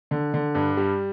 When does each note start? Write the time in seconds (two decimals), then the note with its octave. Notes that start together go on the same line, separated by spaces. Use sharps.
0.11 D3
0.34 D3
0.55 G2
0.77 G3